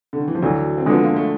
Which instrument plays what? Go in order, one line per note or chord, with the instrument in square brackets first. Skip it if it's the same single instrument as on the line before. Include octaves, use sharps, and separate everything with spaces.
[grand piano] D3
D#3
E3
F3
[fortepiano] D2 [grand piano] E3 F#3
[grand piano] C4
[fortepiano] D3 F3 G#3 [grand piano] B3
[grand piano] A#3
A3